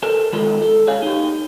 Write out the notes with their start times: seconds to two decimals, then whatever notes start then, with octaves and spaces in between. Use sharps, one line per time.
0.03 A4 A#4 C5
0.33 D#3 G#3 F4 A4
0.62 A4
0.87 G#4 C#5 F5
1.02 D#4 G4